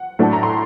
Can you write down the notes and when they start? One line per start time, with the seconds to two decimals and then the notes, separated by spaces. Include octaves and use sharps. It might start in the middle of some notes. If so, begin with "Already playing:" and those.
Already playing: F#5
0.19 A2 F#3 A3 D4 A5
0.33 A#5
0.43 C6